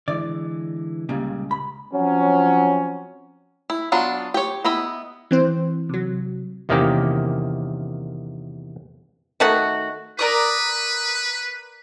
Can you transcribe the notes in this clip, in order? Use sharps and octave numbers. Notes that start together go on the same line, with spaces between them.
D3 E3 G#3 D5
C#2 A#2 C#3 G3
B5
F3 F#3 C4 C#4
E4
F#3 B3 D4 F4
G4 C#5
B3 E4 D#5 E5 B5
E3 C4 C5
C3 F#3
E2 C3 D#3 A#3 C#4 G4
D#3 A3 F#4
A#4 B4 D5 D#6